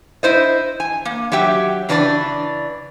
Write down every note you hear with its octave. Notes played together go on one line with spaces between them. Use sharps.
E4 C5 D#5
G#5
A#3
F#3 G4 E5 G5
C#3 E3 D4 B4 D5